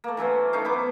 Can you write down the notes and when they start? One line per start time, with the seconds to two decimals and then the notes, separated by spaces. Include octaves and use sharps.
0.04 A3 A#3
0.17 E3 F#3 C#4 C5
0.53 A3 C#4 D#4 F5
0.65 B3 E4 C5 D6